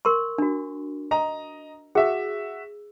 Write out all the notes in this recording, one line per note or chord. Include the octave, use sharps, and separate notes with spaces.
A#4 C6 C#6
D4 F#4
D#5 A#5
F#4 G#4 E5